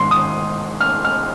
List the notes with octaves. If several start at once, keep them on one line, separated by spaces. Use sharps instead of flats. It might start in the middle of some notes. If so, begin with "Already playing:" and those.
Already playing: G#2 D#3 C6
D#6
F6
F6